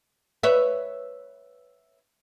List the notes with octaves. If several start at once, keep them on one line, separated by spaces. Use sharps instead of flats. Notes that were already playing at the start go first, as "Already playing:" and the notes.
B4 C#5 E5